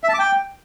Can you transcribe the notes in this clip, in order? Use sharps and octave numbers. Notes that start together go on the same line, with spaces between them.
E5
A5
D6
G5